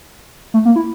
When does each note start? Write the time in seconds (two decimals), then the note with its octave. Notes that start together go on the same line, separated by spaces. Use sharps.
0.54 A3
0.65 A#3
0.76 E4